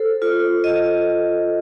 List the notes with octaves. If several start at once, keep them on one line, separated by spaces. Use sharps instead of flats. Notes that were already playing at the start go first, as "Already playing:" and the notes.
Already playing: A4 C5
F4
D#5